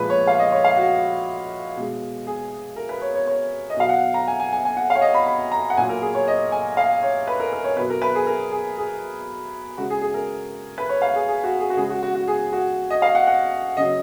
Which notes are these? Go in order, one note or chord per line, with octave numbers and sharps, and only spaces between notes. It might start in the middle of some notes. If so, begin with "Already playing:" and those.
Already playing: A#2 F3 G#3 B4
C#5
F5
D#5
C#5
F5
F#4
B2 G#3
G#4
A#4
B4
C#5
C#5
C#5
D#5
B2 F#3 F5
F#5
A#5
G#5
G#5
G#5
G#5
F#5
F5
C#5
D#5
B5
B5
A#5
F#5
A#2 F#3 G#5
A#4
G#4
C#5
D#5
G#5
F5
C#5
B4
A#4
A#4
C#5
B2 F#3 B4
A#4
B4
G#4
A#4
G#4
G#4
C#3 G#3 F#4
G#4
G#4
A#4
B4
C#5
F5
G#4
G#4
F#4
G#4
F#4
C#3 G#3 G#4
F#4
F#4
F#4
G#4
F#4
D#5
F5
F#5
F#5
C#3 F#3 D#5